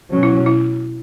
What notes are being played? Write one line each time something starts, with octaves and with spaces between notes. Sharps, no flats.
B2 F#3 C#4
E4
E4